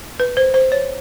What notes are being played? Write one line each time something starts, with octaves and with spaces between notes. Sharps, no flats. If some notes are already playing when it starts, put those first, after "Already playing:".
B4
C5
C5
C#5